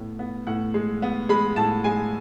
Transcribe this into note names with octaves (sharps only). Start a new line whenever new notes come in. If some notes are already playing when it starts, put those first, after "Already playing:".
Already playing: A2 B3
B3
A2 F#5
G#3
B3
G#3 B5
A2 A5
G#3 G#5